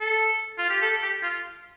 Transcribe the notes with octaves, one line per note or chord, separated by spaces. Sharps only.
A4
F4
G4
A4
G4
F4